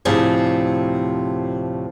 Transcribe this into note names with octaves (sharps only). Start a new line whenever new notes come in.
D2 A2 C3 F3 G#4